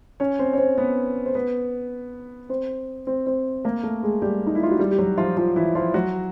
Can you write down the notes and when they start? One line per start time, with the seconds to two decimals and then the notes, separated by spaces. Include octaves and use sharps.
0.20 C#4 C#5
0.39 C4 C5
0.53 C#5
0.58 C4 C5
0.77 B3 B4
1.26 C5
1.35 B3 B4
2.49 C4 C5
3.07 C4 C5
3.26 C4 C5
3.65 A#3 A#4
3.83 A3 A4
4.03 G#3 G#4
4.22 G3 G4
4.47 D#4
4.55 E4
4.63 F4
4.71 F#4
4.79 G3 G4
4.91 G4
4.99 F#3 F#4
5.18 F3 F4
5.37 F3 F4
5.56 E3 E4
5.75 F3 F4
5.94 F#3 F#4